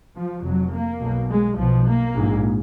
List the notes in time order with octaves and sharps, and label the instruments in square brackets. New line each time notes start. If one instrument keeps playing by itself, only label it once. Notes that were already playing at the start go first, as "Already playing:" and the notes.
[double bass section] F3
F1 F2 F#3
A#3
B1 B2
G#3
B1 B2 F3
A#3
A#1 G#2